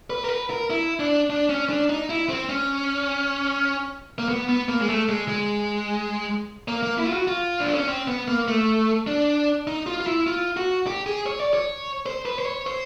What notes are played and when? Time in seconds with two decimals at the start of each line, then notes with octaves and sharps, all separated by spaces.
0.10 B4
0.24 A#4
0.29 B4
0.50 A#4
0.70 E4
1.00 D4
1.30 D4
1.50 C#4
1.69 D4
1.89 D#4
2.10 E4
2.29 C4
2.50 C#4
4.18 A#3
4.29 B3
4.49 B3
4.69 A#3
4.81 G#3
4.89 A3
5.09 G#3
5.28 G#3
6.68 A#3
6.83 A#3
6.98 E4
7.05 F4
7.13 F#4
7.27 F4
7.60 D4
7.74 C#4
7.87 C4
8.08 B3
8.28 A#3
8.48 A3
9.07 D4
9.67 D#4
9.87 F4
10.00 F4
10.07 E4
10.27 F4
10.57 F#4
10.87 G4
11.06 G#4
11.26 C#5
11.40 D5
11.54 C#5
12.06 C5
12.26 B4
12.39 C5
12.46 C#5
12.67 C5